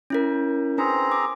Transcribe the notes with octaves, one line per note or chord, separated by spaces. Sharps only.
C#4 E4 A#4
C4 D4 G#4 B4 A#5
D6